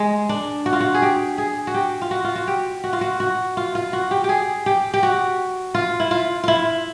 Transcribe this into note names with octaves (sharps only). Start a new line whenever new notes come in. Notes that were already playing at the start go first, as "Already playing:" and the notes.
Already playing: G#3
D4
F#4
F4
F#4
G#4
G4
G#4
F#4
G4
F4
F#4
F4
F#4
G4
F#4
F4
F#4
F#4
F4
F4
F#4
G4
G4 G#4
G4
G4
F#4
F4
E4
F4
E4 F4